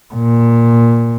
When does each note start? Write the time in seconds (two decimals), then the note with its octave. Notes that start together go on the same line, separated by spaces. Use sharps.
0.14 A#2